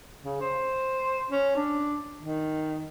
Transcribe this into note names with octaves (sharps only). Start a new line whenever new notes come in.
C#3
C5
C#4
D4
D#3